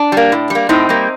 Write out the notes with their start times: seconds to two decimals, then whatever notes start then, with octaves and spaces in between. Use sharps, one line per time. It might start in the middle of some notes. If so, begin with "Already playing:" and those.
Already playing: D4
0.12 G3 A#3
0.32 A2
0.50 G3 A#3
0.69 A2 C4 D#4
0.89 G3 A#3